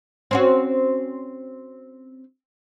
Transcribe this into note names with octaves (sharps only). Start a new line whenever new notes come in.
C4 C#4 F#4